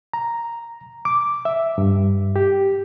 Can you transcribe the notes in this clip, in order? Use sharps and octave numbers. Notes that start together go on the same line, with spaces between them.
A#5
D6
E5
G2
G4